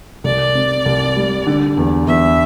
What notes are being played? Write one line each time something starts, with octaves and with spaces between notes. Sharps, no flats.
C2 D5
C3
C2
G3
D3
E2
E2 E5